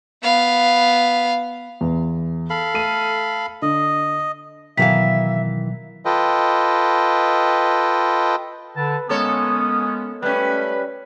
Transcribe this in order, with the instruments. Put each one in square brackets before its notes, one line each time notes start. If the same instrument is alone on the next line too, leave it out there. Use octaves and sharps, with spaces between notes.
[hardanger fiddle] B3 F5
[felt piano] E2
[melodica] A4 F5 B5
[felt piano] A3 D#7
[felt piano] D3 [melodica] D#5
[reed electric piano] B2 F#3 [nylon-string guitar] D#3 E3 F5 [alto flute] E5 [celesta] B6
[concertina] F4 A4 B4 D#5 G5
[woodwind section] D3 A5 [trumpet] B4
[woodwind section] G#3 B3 C#4 [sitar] A#3 A4 C#5 [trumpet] D#6
[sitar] G3 C#4 [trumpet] A3 [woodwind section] B4